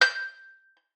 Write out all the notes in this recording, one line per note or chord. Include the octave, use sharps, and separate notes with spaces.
G6